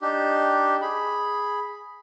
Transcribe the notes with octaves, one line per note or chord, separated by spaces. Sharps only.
D4 D#4 G4
G#4 B5